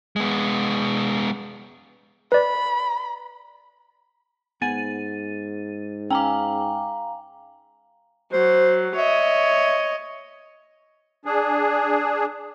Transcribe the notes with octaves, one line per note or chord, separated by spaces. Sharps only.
G#3 B3
B4 D5 B5
G#2 B3 F#5 G#5 A6 D#7
C#4 F5 G5 G#5 A#5 D6
F#3 C5
C#5 D#5 E5
D4 G#4